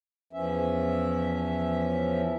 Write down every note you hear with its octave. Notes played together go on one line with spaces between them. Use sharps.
E2 E3 F3 C#4 E5